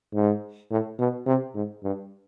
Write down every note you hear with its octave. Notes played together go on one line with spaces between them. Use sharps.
G#2
A2
B2
C3
G#2
G2